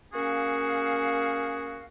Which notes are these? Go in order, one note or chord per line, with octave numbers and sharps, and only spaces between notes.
A#3 C#4 F#4 G#4 F5